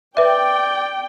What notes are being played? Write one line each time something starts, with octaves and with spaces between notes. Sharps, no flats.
B4 D5 E5 G5